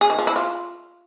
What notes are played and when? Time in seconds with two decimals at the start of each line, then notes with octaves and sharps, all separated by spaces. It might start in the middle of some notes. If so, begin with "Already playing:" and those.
0.01 G#4
0.10 D#3
0.19 F3
0.27 E4
0.36 F4